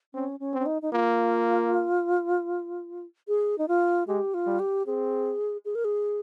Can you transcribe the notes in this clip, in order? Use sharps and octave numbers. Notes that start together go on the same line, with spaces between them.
C4 C#4
C#4
C4
C#4
D#4
D#4
A#3 F4
G#4
D#4
F4
G#3 G4
F4
G3
G4
C4 G#4
G#4
A#4
G#4